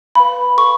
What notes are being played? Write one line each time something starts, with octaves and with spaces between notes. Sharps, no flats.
B4 F5 B5
A4 C#6